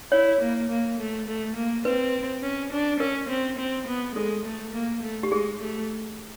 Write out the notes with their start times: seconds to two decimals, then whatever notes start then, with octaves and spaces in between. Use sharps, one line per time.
0.12 E4 C#5
0.41 A#3
0.70 A#3
0.99 A3
1.27 A3
1.56 A#3
1.85 C4 B4
2.42 C#4
2.72 D4
3.00 C#4 A#4
3.29 C4
3.58 C4
3.87 B3
4.15 G#3 A4
4.45 A3
4.74 A#3
5.02 A3
5.23 G4
5.32 G#3 G#4
5.60 A3